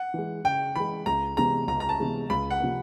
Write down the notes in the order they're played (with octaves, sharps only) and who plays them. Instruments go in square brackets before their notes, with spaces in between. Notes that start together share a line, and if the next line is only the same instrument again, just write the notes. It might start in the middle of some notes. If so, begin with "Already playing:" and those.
Already playing: [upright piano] F#5
[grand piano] E3 G#3
[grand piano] C#3 [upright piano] G5
[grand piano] E3 G#3 [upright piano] B5
[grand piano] C#2 [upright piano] A#5
[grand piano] C3 E3 G#3 B3 [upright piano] A#5
[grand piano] C#2 [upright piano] A#5
[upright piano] A#5
A5
[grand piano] C3 E3 G#3 B3
[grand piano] C#2 [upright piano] B5
[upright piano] F#5
[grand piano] C3 F3 A#3